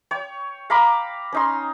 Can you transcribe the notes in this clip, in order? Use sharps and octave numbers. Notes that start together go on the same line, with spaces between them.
C#5 G5
F5 A#5 B5 D6
C#4 D#4 C6